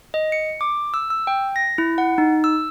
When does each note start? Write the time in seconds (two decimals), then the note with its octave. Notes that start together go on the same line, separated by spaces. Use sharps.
0.14 D#5
0.32 C#7
0.61 D6
0.94 E6
1.10 E6
1.27 G5
1.56 A#6
1.78 E4
1.98 F#5
2.18 D#4
2.44 E6